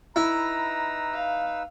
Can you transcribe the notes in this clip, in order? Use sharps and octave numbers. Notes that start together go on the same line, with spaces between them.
D#4 E4 B4 A#5 E6
F5